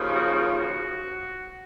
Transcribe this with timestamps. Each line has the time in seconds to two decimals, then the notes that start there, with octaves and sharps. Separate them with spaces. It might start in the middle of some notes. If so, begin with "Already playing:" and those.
Already playing: D#2 C#3 F3
0.15 F#4
0.37 F4
0.58 F#4